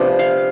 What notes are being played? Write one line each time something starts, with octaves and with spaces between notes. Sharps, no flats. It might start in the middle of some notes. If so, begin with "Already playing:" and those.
Already playing: C3 F3 B3 D4 D5
F5